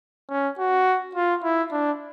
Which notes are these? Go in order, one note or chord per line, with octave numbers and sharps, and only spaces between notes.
C#4
F#4
F4
E4
D4